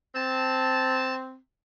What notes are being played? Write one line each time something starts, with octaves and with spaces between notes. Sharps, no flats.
C4 A5 A6